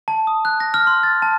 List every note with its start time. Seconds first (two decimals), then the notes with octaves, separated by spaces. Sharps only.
0.08 A5
0.27 D#6
0.45 F#6
0.60 A#6
0.74 F6
0.87 C6
1.03 A6
1.22 A5